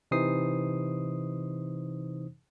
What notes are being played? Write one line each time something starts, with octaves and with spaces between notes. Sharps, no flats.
C3 E3 D#4 C5 D#6 C7